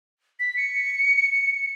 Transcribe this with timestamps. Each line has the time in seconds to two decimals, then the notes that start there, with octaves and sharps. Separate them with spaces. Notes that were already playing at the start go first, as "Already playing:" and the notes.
0.40 B6
0.57 C#7